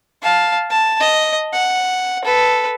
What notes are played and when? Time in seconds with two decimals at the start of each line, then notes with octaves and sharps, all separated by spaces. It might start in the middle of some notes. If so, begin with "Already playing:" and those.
0.22 F5 A5
0.70 A5
1.00 D#5
1.53 F#5
2.24 A4 B4